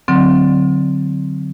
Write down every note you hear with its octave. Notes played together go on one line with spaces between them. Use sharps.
D3 F#3 C4